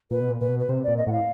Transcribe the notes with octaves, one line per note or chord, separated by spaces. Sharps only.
A#2 B4
B2
A#2
A#2 B4
B2
B4
C3 C5
A#2 D5
D#5
A2 F5 F#5